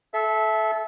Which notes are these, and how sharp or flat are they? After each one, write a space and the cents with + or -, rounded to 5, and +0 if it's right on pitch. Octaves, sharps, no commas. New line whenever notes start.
A4 -25 E5 +0